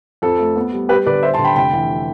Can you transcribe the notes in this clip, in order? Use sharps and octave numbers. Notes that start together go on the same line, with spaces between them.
F2 A4
A3
B3
G3
G3 G4 B4
D3 B4 D5
G3 C5 E5
A5 C6
D3
G5 B5
F1 G5 B5
E3